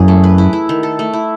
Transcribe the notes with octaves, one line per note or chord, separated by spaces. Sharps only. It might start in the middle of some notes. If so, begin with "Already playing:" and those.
Already playing: F#2 E3 G#4
A3
B4
E4
E4
D#3
A4
A3
E4